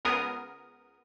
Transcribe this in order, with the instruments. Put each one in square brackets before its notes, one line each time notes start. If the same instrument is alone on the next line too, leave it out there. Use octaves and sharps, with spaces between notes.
[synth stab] C#2 B3 G#4 A#4 D#6